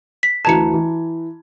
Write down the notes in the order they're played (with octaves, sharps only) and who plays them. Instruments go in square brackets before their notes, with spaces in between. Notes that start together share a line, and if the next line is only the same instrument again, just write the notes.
[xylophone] B6
[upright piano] D2 E3 G#6 [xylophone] A5 A#5 C#7
[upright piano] E3